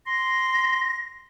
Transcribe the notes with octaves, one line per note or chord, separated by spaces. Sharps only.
C6 A#6